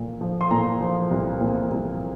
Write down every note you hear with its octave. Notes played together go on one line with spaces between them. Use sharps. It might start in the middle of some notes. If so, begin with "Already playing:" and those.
Already playing: A#2
F3
C6
A#2 A#5
F3
C2
A#2
C2